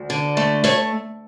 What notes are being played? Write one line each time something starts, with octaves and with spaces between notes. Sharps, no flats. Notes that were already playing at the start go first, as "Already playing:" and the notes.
Already playing: D2
D3
A3
A3 C#5